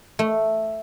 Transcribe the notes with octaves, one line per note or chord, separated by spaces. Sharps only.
A3